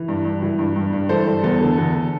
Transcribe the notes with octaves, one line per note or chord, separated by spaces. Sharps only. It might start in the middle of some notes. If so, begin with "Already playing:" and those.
Already playing: E3
G2
G2
E3
G2
G2
G2
E3 A4 C5
G2
E2 A4
D3
E2